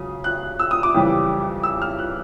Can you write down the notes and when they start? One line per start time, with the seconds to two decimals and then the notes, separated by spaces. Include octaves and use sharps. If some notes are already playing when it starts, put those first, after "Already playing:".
Already playing: C#2 C#3 F#3 D#6
0.24 F#6
0.59 E6
0.71 D#6
0.83 D6
0.94 F2 C#3 E3 G3
1.63 E6
1.82 F6
1.99 F#6